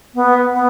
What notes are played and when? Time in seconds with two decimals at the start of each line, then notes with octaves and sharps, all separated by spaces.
0.15 B3
0.52 B3